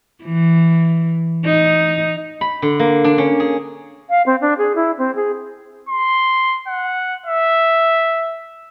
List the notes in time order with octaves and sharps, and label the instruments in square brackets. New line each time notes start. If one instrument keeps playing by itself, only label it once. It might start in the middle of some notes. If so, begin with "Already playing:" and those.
[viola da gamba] E3
D#4
[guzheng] B5
D3
A#3
D4
C#4
G#4
[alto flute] F5
C4
D4
G#4
E4
C4
G#4
[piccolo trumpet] C6
F#5
E5